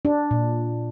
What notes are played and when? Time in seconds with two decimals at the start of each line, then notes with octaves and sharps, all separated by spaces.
0.05 D4
0.31 A#2